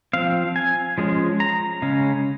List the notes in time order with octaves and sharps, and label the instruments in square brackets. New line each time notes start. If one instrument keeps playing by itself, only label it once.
[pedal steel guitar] F3 C4 F5
G#5
F3 G#3 C#4
A#5
C#3 G#3 C#4